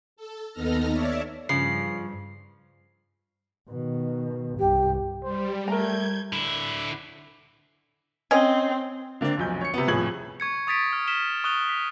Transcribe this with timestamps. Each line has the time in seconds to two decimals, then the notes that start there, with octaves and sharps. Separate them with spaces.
0.16 A4
0.53 D#2 B3 D#4 A4 F6 A#6
0.91 C#5 D5 E5 A5
1.49 G2 C#3 F3 C7
3.70 B2 D#3
4.59 C2 G2 G4
5.23 G3 C5
5.68 A3 A#4 A#5 G6 G#6
6.33 D3 E4
8.31 C4 C#4 D#5
9.21 D3 A#3 C4 D4
9.38 F1 B1 G6
9.61 C#5 C#7
9.74 C3 B3
9.88 D#1 F2 A2 G#4 G#6 F#7
10.40 C#6 G#6 C#7
10.67 C#6 D#6 A6 B6 D7
10.93 F6
11.07 F6 B6 E7 G7
11.44 C#6 D#6 F#6 G7
11.69 B6